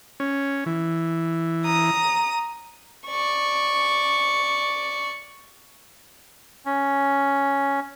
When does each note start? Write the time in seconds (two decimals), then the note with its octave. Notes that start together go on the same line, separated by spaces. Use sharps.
0.20 C#4
0.66 E3
1.65 A#5 D#6
3.07 D5 C#6
6.66 C#4